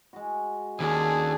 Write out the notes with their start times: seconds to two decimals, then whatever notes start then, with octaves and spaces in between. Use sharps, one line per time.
0.13 G#3 F#4
0.80 D#2 C#4 D4 G#4 A4